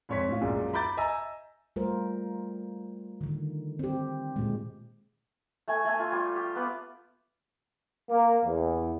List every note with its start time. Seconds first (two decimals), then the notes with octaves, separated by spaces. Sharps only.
0.09 F2 G#2 C#5 C#6 B6
0.29 A2 F4
0.41 A#1 F#2 A#2 G#3
0.73 A#5 B5 D6 G6 A6
0.97 D#5 E5 G#5 A#5 E6
1.76 G3 A3 F4 A#4 C5
3.21 D3 D#3
3.79 C4 G4
4.36 A#2 G#3
5.68 A3 G#5
5.85 A3 G#5
5.99 F4
6.12 G3 F4
6.36 G4
6.56 B3 F4 F#5 D6
8.10 A#3
8.44 E2